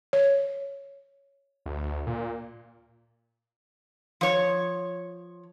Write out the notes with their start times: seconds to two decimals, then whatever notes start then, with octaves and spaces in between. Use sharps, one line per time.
0.13 C#5
1.66 D2
2.07 A#2
4.21 F3 C#5